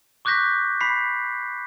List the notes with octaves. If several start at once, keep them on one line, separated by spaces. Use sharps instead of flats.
C#6 D6 F#6 G6 A#6 B6
B5 B6 C7